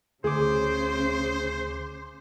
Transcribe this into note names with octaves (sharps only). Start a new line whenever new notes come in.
D2 C#3 G#4 C5 D6